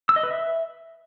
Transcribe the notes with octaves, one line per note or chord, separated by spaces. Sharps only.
E6
D#5
B4
E5